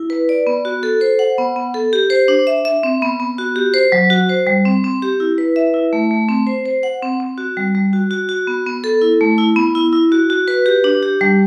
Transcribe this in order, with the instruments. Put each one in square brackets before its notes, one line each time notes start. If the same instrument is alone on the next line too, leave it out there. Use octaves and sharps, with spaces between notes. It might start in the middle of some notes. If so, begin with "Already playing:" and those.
Already playing: [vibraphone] E4
B4
D5
B3
F#4
A4
C5
F#5
B3
B3
A4
G4
C5
D4
E5
E5
C4
B3
B3
F#4
G4
C5
F#3
F#4
C5
G3
C4
C4
G4
E4
B4
E5
E4
A3
A3
C4
C5
C5
F#5
C4
C4
F#4
G3
G3
F#4
F#4
F#4
B3
B3
A4
E4
A3
E4
B3
E4
E4
F#4
F#4
B4
G4
D4
G4
G3